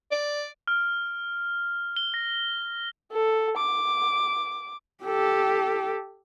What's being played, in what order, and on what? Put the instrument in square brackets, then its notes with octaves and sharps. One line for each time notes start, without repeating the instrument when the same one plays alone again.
[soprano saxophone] D5
[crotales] F6
G7
A#6
[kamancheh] A4
D6
[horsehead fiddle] G4 A4